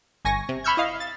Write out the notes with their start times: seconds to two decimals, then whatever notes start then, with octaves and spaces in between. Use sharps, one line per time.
0.25 G1 G#5 C#6 A#6
0.49 C3
0.64 B5 C#6 E6 F6 G6 G#6
0.77 E4 D#5 F5
1.00 A6